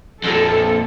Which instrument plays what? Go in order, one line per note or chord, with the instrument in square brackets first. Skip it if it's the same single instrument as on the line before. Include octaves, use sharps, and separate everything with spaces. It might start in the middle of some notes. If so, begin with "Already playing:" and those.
[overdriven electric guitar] F2 A#2 [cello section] A4